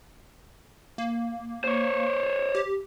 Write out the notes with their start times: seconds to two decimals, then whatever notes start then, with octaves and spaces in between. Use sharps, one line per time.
0.98 A#3
1.64 C5 C#5
2.55 G4